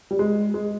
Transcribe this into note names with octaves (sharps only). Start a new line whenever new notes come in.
G3
G#3
G#3